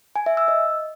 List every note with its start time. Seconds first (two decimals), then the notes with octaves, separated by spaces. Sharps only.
0.16 G#5
0.26 E5
0.37 E6
0.48 D#5